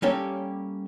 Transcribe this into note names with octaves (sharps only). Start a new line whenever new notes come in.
G3 A#3 C#4 G4 A4 A#4